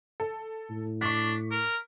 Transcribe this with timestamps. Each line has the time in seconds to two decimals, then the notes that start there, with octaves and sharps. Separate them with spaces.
0.20 A4
0.70 A2
1.01 D4 C#6 D6 B6
1.51 A#4